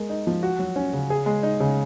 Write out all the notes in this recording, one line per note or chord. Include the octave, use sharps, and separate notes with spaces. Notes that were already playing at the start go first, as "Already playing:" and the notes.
Already playing: G#3 A#4
D#4
F3
F#4
F#3
C#4
C#3
G#4
G#3
D#4
C#3